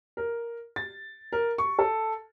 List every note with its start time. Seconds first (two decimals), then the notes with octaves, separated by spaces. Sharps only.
0.17 A#4
0.76 A6
1.32 A#4
1.58 C#6
1.79 A4